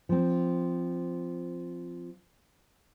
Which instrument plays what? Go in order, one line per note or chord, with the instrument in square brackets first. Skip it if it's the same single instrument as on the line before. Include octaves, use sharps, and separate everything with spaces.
[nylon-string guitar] F3 C4